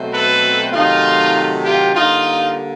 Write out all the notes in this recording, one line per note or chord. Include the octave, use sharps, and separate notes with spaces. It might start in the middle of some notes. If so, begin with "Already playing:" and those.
Already playing: B2 F#3 A3 C4
A4 B4
C3 D#3 F#3 A3 D#4 F4
F4 G4
D3 G3 A#3 D#4 F4